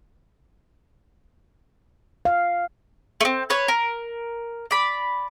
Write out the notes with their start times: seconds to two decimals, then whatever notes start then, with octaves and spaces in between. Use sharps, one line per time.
2.25 F5
3.21 A3 C4
3.50 B4 C#5
3.68 A#4
4.71 D5 B5